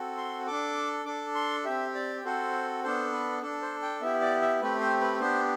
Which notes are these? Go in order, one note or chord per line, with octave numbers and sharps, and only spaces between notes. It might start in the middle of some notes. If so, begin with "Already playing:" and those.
Already playing: C4 F#4 A4
C6
D4 A4 D6
D4 A4 D6
C6
C4 G4 E5
D5
C4 F#4 A4 C5
B3 D4 A4 C5
B4
D4 A4
C5
G5
B3 E4 G4 E5
D5
E5
A3 C4 G4 B4
C5
B4
B3 D4 G4 C5